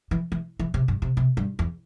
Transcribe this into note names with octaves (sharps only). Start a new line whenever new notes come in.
E3
E3
E3
C3
G2
C3
C3
G2
E2